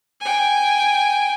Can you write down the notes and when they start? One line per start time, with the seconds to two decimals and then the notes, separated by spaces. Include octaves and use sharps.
0.21 G5 G#5